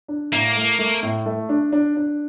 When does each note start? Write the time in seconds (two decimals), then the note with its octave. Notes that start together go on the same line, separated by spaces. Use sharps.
0.08 D4
0.32 A2 A#3
0.56 A3
0.79 A3
1.03 A2
1.26 A3
1.49 D4
1.72 D4
1.97 D4